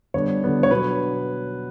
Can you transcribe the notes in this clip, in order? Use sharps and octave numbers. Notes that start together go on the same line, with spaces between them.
D3 G3 B3 D4 C#5
D3 G3 B3 D4
C#5
B2 F#3 B3 D4 B4